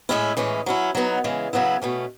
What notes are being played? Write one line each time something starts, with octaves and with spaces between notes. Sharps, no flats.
A2 G#3 C#4 E4
A2 E3 G#3 C#4
F#3 C#4 E4
F#3 B3 D#4
C#3 E3 G#3
C#3 F#3 B3 E4
B2 A3 C#4